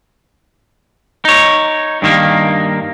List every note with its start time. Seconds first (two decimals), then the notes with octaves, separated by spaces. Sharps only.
1.25 D#4 C#5
2.02 G2 D#3 A#3